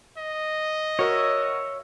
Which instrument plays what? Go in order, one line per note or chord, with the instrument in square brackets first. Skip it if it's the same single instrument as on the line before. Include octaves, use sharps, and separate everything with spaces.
[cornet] D#5
[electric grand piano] F#4 A#4 [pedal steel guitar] C#5 E5